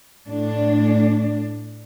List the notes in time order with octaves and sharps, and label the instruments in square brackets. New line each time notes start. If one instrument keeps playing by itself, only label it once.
[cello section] A2 D4